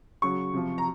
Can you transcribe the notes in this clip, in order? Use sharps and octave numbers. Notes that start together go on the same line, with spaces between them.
C#3 F#3 C#6
C3 F3
A#5